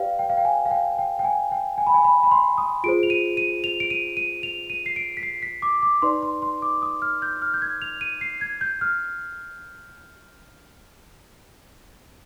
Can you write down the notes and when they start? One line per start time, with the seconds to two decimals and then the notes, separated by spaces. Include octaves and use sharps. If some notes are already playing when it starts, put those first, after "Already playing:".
Already playing: G4 B4 D5 F5 G5
0.19 G5
0.29 F5
0.37 G5
0.45 G#5
0.65 F5
0.71 G5
0.99 G5
1.19 G5
1.24 G#5
1.52 G5
1.78 G#5
1.87 B5
1.94 G#5
2.04 B5
2.23 B5
2.31 C6
2.58 D#6
2.84 F4 G#4 C5 D7
3.03 F7
3.10 D#7
3.37 D#7
3.64 F7
3.80 D7
3.90 D#7
4.17 D#7
4.43 F7
4.70 D#7
4.86 C7
4.96 D7
5.17 B6
5.23 C7
5.43 B6
5.62 D6
5.82 D6
6.02 D#4 B4 D5 C6
6.22 C6
6.42 C6
6.62 D6
6.82 D#6
7.02 F6
7.22 G6
7.42 F6
7.54 G6
7.62 G#6
7.82 F7
8.01 D#7
8.21 C7
8.41 G#6
8.61 G6
8.81 F6